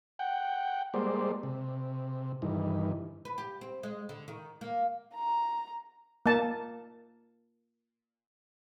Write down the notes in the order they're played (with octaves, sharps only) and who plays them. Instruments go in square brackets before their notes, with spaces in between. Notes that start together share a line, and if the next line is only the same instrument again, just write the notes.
[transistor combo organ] F#5 G5
G3 G#3 A#3 C5 D5
C3
G2 D#3 E3
[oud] B4
G4
C4
G#3
D3
D#3
A#3
[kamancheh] A#5
[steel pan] A#3 A5